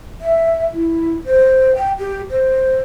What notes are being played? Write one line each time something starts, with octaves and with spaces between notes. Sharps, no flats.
E5
E4
C5
G5
G4
C5